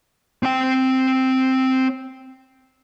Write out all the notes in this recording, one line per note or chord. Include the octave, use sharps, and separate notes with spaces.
C4 G5